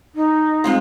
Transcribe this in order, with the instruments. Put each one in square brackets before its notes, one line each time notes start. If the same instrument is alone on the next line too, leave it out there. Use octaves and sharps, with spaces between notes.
[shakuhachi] D#4
[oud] G#3 C4 F4